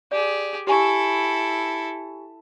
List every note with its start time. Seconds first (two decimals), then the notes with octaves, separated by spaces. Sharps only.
0.12 G4 G#4 D5
0.67 E4 G4 A4 G#5 C#6